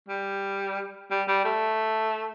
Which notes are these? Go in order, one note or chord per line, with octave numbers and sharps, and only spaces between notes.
G3
G3
G3
A3